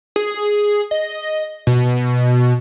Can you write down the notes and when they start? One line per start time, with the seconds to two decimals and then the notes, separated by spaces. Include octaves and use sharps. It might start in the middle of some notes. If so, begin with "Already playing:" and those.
0.16 G#4
0.91 D#5
1.67 B2